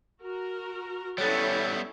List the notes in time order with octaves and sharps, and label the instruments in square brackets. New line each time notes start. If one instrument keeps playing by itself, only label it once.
[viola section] F#4 A#4
[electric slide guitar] G3 B3 [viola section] C#4 E4 A4 [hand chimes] C#5 F#6 A6